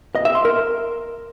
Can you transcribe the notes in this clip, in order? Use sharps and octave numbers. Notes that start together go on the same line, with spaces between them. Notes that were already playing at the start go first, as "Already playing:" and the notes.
D#5
E5
C6
A#4